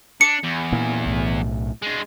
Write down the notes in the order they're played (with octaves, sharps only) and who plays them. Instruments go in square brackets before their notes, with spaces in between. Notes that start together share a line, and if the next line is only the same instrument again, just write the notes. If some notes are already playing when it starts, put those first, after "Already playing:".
[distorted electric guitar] D4 [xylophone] C#7
[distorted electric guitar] E2
[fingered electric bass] A#2 E3
B1 A2
[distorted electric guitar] G#3 D4